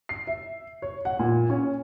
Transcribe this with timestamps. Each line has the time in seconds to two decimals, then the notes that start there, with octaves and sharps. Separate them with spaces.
0.09 C7
0.27 E5
0.82 C#5
1.05 F#5
1.19 A#2
1.50 C#4